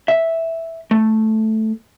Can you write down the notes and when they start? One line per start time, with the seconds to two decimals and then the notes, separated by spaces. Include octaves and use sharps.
0.08 E5
0.91 A3